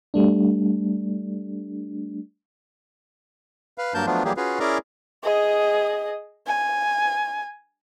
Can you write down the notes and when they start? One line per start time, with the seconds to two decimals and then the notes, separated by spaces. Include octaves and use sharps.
0.14 G3 A3 D4
3.78 B4 F5
3.94 G2 F#3 A#3 A#4 A5 G6
4.06 F3 F#3 A3 B3 D4 F4
4.24 E3 F#3 G3 A#3 G4 G#4
4.37 C#4 F4 F#4 G#4 B4 F5
4.60 C#4 E4 G#4 A#4 D5 A#5
5.24 G#4 D#5
6.47 G#5